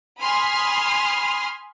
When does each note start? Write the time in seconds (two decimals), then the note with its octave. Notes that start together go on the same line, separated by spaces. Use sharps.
0.21 G#5 B5 C6 D#6 F6